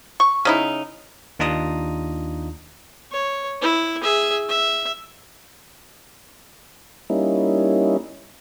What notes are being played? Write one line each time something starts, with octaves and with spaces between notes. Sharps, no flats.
C#6
C#3 D#4 E4
D#2 D4 D#4 F4 A#5 D#6
C#5
E4
G#4 E5
E5
G3 A#3 C#4 D#4 E4